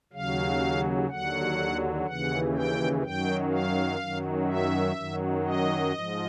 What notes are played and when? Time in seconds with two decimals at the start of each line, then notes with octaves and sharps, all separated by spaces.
0.13 D#2 C#3 F#3 F5
1.09 D#2 D3 F#3 F#5
2.06 D#2 C#3 E3 F#5
2.55 G5
3.03 F#2 D#3 F#3 G5
3.51 F5
3.99 F#2 D#3 F#3
4.48 E5
4.96 F#2 D#3 F#3
5.44 D#5
5.93 G#2 F3